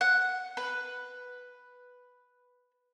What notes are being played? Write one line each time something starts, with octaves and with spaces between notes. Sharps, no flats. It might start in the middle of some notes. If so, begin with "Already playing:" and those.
F#5
B4